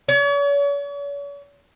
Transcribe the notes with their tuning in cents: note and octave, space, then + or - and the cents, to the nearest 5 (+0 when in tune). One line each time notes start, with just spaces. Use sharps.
C#5 +40